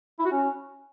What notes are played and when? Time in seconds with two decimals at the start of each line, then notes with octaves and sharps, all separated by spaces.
0.19 E4
0.25 F#4
0.31 C#4